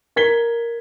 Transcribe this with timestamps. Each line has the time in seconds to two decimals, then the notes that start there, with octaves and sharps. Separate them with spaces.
0.16 A#4 G#6 B6 G7